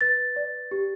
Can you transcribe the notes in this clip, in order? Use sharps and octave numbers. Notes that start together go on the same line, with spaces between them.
B4 A6
D5
G4